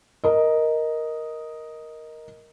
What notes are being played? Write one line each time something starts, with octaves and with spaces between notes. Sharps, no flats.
A#4 D#5